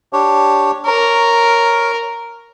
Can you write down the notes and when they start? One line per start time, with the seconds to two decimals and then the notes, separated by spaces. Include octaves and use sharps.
0.13 D4 G4 C#5
0.86 A#4 C#5